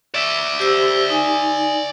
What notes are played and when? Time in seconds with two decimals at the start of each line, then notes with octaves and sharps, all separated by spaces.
0.14 D5 E5
0.60 G4 C5 E6
1.10 D#4 G#5